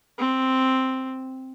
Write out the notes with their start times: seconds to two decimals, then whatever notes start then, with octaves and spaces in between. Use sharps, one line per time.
0.18 C4